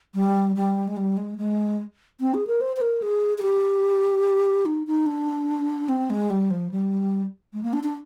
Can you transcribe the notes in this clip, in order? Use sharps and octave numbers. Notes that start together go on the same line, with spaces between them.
G3
G3
G#3
G3
G#3
G#3
C4
G#4
A#4
C5
C5
A#4
G#4
G#4
G4
D#4
D#4
D4
C4
G#3
G3
F3
G3
G#3
A#3
D4
D4